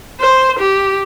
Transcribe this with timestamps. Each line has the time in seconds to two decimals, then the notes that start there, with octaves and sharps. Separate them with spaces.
0.20 C5
0.59 G4